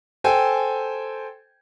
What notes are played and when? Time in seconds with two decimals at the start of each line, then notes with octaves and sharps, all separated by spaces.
0.24 A4 C5 G5 G#5